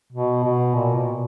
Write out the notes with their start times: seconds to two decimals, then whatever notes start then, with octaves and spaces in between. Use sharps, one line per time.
0.13 B2
0.44 B2
0.75 A#2
0.95 B2